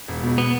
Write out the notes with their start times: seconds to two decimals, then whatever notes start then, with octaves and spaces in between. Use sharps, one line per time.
0.08 E1
0.23 B2
0.38 B3